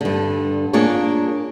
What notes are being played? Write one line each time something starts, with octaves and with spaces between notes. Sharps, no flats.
G2 D3
A#3 D4 F4 G#4 C#5